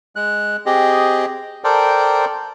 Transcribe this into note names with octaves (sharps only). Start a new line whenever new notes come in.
G#3 F#6
C4 G4 G#4 D#5
A4 A#4 C5 D5 G5